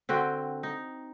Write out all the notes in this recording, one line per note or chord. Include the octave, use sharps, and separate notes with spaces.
D3 C4 F#4 G5
D#4